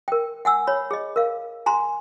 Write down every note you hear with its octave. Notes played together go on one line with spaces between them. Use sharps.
A#4 G5
F#5 G#5 E6
C#5 B5
G#4 D#5
A#4 F5
G#5 A#5 C6